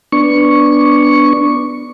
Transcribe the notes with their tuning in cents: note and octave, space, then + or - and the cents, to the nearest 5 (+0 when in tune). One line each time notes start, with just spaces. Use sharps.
B3 +0 D4 +0 C#6 +0